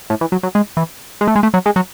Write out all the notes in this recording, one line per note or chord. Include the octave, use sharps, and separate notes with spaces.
A2
E3
F#3
F#3
G#3
E3
G#3
A3
G#3
A3
F#3
G#3
F#3